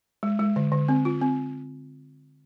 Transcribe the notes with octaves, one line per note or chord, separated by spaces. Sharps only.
G#3
G#3
D3
D3
C4
F4
C4